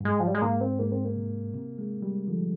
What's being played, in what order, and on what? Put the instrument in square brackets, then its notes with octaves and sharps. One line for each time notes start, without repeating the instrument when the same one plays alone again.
[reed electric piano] G2
[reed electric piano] G#2 [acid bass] G#3
[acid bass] F3
G3
G#3
[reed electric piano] G#2 [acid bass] A#3
[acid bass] C4
[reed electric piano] G#2 [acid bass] A#3
[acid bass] C4
A#3
[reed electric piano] C3
C3
G#3
G3
[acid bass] D3 [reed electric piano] F3